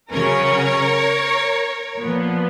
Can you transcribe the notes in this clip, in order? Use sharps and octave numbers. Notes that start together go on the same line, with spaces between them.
C#3 F#3 C#4 A#4 C#5
A#2 F3 B3